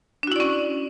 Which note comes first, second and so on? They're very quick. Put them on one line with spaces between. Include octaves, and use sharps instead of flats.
D4 F#4 E4 D5 C#4